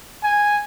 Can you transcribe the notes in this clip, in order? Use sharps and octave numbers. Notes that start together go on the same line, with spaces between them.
G#5